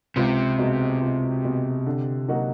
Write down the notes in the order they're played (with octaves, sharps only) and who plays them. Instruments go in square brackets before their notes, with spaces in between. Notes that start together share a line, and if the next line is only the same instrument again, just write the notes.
[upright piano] C#2 [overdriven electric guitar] C3
[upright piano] B2 G#3
C#2
B2 G#3
D3
F#3 A#3 D#4 F#4